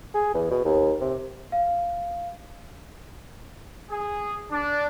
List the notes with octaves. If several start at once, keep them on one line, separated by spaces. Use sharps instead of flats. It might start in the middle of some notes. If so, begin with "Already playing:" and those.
G#4
E2
B2
D#2
C3
F5
G#4
D4